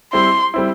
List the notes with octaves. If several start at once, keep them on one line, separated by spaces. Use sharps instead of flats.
G3 C4 E4 C6
G3 C4 E4